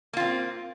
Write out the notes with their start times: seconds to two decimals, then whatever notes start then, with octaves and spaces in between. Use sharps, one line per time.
0.13 A#3
0.17 F4
0.20 C4